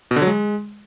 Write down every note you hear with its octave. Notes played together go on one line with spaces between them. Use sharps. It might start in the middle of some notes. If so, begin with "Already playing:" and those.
B2
D3
F#3
G#3